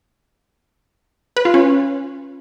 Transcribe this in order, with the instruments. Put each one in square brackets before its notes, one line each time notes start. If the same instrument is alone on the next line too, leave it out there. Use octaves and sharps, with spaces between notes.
[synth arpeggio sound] B4
F4
C#4